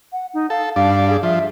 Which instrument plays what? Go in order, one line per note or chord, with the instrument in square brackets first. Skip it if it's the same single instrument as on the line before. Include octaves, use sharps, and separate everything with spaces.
[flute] F#5
D#4
[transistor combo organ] A4 [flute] F5
[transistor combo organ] G2 D4 [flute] F5
[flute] G#4
[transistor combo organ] F3 [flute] E5